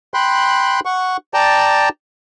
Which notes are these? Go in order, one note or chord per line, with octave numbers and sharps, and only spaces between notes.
G5 B5 C6 F#6
F#5 C#6
D5 G5 A5 A#5